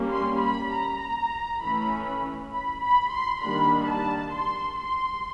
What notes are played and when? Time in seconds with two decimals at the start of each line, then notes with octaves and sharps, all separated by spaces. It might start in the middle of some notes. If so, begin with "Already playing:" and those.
Already playing: G3 A#3 C#4
0.11 C6
0.41 B5
0.72 A#5
1.62 E3 A3 C#4 B5
2.53 B5
2.82 B5
3.12 C6
3.42 D#3 G3 A#3 D4 B5
3.88 A5
4.33 C6
4.78 C6